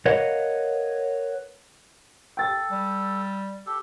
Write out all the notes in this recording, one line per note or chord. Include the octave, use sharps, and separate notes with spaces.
A#4 B4 C#5 D#5 F5 F#5
A4 G5 A6
G3
G4 A4